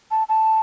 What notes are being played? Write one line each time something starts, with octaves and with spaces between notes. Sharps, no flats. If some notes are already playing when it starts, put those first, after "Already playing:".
A5
A5